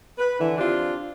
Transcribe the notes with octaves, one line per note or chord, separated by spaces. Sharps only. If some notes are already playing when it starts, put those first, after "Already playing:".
B4
D3 E3
C4 D4 F4 G4